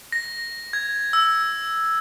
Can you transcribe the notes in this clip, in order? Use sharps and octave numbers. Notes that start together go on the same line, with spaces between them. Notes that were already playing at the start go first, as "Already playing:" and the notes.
A#6
G#6
E6